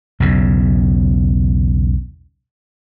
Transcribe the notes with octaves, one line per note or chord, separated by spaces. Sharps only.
B1 E2 C#3